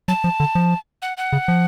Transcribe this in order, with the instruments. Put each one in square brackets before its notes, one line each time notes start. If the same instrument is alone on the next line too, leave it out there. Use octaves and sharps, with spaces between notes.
[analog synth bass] F#3 [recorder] A5
[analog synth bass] F3
D3
F3
[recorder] F#5
F#5
[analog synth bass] C#3
F3